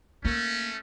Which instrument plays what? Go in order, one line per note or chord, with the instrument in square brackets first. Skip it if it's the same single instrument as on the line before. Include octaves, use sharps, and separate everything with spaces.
[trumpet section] A3 C#4 [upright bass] A#3